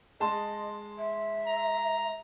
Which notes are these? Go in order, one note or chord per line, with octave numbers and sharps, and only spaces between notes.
G#3 D#5 A5 C6
E5
A#5